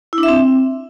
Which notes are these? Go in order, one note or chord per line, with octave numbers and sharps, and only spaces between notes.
E4
D4
E5
C4